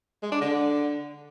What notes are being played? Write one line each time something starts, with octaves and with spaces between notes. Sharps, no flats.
G#3
D4
D3